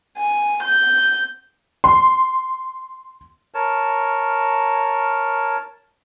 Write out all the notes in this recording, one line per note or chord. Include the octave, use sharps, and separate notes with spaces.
G#5
G6
C6
A#4 C#5 A5